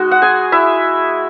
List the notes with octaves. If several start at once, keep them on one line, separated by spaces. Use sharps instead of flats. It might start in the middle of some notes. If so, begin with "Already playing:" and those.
Already playing: G#3 D#4 F#4
F#5
G#4 G#5
E4 E5